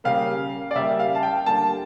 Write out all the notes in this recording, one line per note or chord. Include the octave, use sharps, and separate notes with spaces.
C#3 G3 A#3 F5
D5
C#3 G3 A#3 E5
F5
A5
G5
D3 G3 A#3 A5